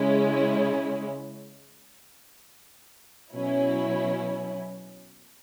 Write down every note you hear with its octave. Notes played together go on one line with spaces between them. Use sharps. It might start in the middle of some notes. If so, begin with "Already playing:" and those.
Already playing: C#3 G#3 C#4 E4
B2 F#3 C#4 E4